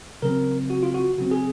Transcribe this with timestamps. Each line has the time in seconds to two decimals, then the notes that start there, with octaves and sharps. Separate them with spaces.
0.22 C#3 F#3 C4 A#4
0.70 F#4
0.83 F4
0.94 F#4
1.17 C#3 F#3 C4 F#4
1.31 G#4